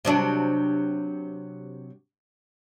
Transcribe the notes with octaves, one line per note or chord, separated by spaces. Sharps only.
C3 F#3 D4